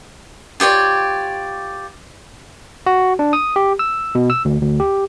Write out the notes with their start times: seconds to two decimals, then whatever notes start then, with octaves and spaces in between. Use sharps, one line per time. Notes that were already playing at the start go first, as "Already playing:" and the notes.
0.60 F4 G4 C#5 D5
2.86 F#4
3.19 D4
3.33 D#6
3.56 G4
3.79 E6
4.15 B2
4.30 E6
4.45 D2
4.61 D2
4.80 G4